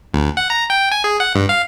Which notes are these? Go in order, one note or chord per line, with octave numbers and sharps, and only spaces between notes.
D2
F#5
A#5
G5
G#5
G#4
F#5
G2
F5